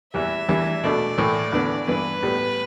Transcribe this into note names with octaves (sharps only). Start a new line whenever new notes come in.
E2 E3 G3 E5
E2 E3 G3 D4
B2 A3 D4 D5
A2 E3 A3
E2 D3 B3 D4
G2 E3 B3 D4 B4
A2 G3 B3